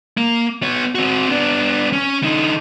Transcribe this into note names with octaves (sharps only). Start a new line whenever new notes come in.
A#3
B3 C#5
C4 F#4
B3 D4
C#4
D3 D#4